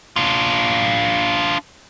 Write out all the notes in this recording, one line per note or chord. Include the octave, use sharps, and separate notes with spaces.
D4 F4